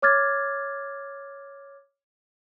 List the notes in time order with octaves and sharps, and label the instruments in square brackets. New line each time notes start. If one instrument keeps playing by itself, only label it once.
[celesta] C#5 D6 F6 G#6 A6